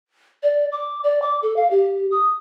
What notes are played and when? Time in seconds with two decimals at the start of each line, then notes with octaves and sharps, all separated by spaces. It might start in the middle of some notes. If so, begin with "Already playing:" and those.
0.43 D5
0.72 D6
1.04 D5
1.22 D6
1.42 A4
1.56 F5
1.71 G4
2.11 D#6